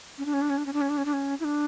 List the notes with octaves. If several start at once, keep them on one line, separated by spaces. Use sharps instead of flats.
C#4
D4
C#4
D4
C#4
D4
C#4
D4
C#4
D4
C#4
D4
C#4
E4
D4